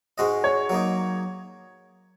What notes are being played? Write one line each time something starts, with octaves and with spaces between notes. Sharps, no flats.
G#2 G#3 F#4 D#5
C#5
F#3 A#3 D#4